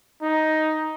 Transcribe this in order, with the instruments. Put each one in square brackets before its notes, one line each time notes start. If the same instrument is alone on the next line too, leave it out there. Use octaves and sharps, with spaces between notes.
[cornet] D#4